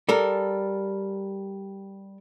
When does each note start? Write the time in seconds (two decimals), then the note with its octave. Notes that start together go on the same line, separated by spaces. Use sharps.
0.09 G3 A4 A#4